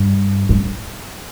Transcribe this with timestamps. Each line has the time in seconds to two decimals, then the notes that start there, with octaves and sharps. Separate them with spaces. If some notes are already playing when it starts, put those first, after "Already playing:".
Already playing: G2
0.49 G2